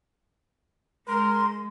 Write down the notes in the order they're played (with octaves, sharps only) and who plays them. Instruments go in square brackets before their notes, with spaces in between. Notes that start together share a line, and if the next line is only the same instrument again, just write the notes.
[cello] G#3 [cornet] A#4 [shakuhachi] C6